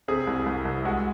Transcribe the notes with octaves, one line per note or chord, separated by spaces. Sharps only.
C3 G#4
C2
C2
C2
G#3 F#4